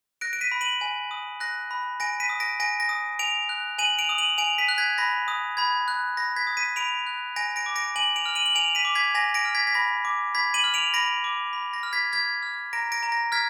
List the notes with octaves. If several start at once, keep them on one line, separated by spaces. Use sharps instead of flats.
F#6 A#6 D7
D7
B6 D#7
B5
D#7 F#7
G#5
D#6
F#6 A#6
B5
G#5 A#6 D7
B6 D#7
D#6
A#6 D7
G#5 A#6 D7
A#6
D#6
G#5 D7 F7
F#6
G#5 D#7 F#7
D7 F7
D#6
D#7 F#7
G#5 D7 F7
B6 D#7
F#6
G#6 B6
B5 A#6
D#6
B5 G#6
F#6
B5 A#6
G#6 B6
D#6
B6 D#7
B5 D7 F7
F#6
G#5 A#6 D7
A#6 D7
D6
A#6 D7
G#5 D#7 F#7
D7 F7
F6
D#7 F#7
F#7
G#5 D7 F7
B6 D#7
D6
G#6 B6
G#5 A#6
A#6 D7
F6
G#6 B6
B6
B5 A#6
D6
B5 G#6 B6
D#7 F#7
F6
D7 F7
B5 A#6 D7
D6
B5
A#6
F6
G#6 B6
F6 G#6 B6
F6
A#5 A#6 D7
A#6 D7
A#5
A#6
F6 G#6 B6